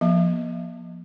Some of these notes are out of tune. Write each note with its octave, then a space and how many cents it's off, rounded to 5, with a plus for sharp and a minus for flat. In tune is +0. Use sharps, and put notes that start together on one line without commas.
F3 +0 A#3 +45 E5 +30